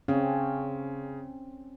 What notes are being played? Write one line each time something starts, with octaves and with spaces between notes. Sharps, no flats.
C#3 C4 C#4